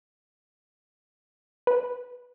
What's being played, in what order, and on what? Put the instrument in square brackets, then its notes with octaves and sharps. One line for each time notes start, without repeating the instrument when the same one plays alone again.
[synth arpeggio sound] B4